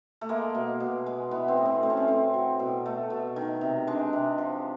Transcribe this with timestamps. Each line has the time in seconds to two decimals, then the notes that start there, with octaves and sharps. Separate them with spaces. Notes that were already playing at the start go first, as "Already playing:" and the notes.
0.21 A3
0.29 G#3 A#3
0.55 B2
0.80 B2
1.06 G#3
1.31 E3 B3
1.48 C4
1.57 A2
1.66 C4
1.83 A3 C4
1.90 C#4
1.97 C4
2.08 A2
2.34 F#3
2.59 B2
2.86 A3
3.10 B2
3.36 D#3
3.61 C3
3.87 G#3 D4
4.13 C3
4.38 F3